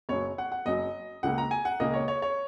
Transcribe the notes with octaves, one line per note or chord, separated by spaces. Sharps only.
F#1 F#2 F#3 C#5
F#5
F#5
F#1 F#2 F#3 D#5
C#2 C#3 A#3 F#5
A#5
G#5
F#5
C#2 C#3 A#3 D#5
C#5
C#5
C#5